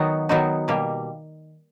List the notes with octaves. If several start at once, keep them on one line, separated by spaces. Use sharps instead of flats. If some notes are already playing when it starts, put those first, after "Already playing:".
Already playing: D#3 F#3 B3 D#4 F#4
D#3 F#3 B3 D#4 F#4
B2 G3 A#3